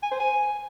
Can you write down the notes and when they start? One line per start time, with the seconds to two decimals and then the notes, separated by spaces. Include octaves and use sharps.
0.03 G#5
0.11 C5
0.20 G#5